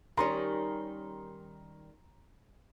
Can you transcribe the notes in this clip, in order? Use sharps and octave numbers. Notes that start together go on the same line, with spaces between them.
D#3 G3 C#4 A#5 C6